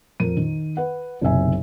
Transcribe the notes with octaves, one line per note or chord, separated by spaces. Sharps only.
F2 A#4 D#7
D#3
B4 F#5
F#1 B1 C3 E5 G#5